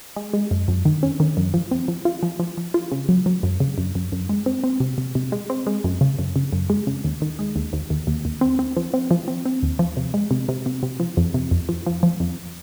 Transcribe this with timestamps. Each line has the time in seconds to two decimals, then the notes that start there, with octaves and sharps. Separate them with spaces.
0.16 G#3
0.33 G#3
0.51 F#2
0.68 F#2
0.85 D#3
1.03 C#4
1.20 D#3
1.37 F#2
1.54 F3
1.71 C4
1.88 F3
2.05 F4
2.23 F3
2.40 F3
2.58 F3
2.74 F4
2.91 C#3
3.09 F#3
3.26 F#3
3.43 F#2
3.60 C#3
3.78 F#2
3.95 F#2
4.12 F#2
4.29 G#3
4.46 C4
4.64 C4
4.80 C3
4.98 C3
5.15 C3
5.32 G#3
5.50 C4
5.67 G#3
5.84 F#2
6.01 C#3
6.19 F#2
6.36 C#3
6.53 F#2
6.70 G#3
6.87 C#3
7.04 D#2
7.22 D#3
7.39 G#3
7.56 D#2
7.73 D#2
7.90 D#2
8.07 D#2
8.25 D#2
8.41 C4
8.59 C4
8.77 F3
8.94 C4
9.11 F3
9.28 C4
9.46 C4
9.63 D#2
9.79 F3
9.97 C3
10.14 G#3
10.31 C3
10.49 C3
10.66 C3
10.83 C3
11.00 F3
11.17 F2
11.34 C3
11.51 F2
11.69 F3
11.86 F3
12.03 F3
12.20 F2